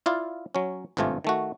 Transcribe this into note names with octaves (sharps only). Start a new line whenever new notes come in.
E4 F4 D5 F5
F#3 C#4
G#1 G2 C3 A3 F4 G#5
D#3 A3 F#4